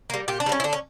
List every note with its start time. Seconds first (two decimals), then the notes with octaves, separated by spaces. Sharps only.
0.10 G3 A#3
0.28 A#2 G4
0.40 D4
0.46 G3 A#3
0.52 C#4
0.60 E4
0.64 D3 D4
0.73 C#4